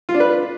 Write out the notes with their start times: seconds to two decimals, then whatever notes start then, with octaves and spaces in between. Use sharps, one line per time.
0.09 F4
0.14 D4
0.20 B4